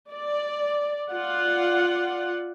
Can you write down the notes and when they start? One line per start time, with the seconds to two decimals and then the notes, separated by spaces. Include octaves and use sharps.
0.11 D5
1.10 F4 D5 F#5